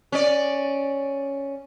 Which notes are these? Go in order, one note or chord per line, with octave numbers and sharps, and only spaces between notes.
C#4 D5